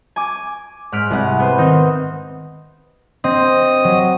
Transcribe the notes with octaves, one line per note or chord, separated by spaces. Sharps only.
G#5 D6
G#2 F6 F#6 B6 D7
C2 F#5
B3 C5
D#3 C4 D#4
C4 D#5
F#3